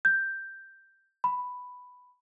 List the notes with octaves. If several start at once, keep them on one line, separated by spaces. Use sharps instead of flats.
G6
B5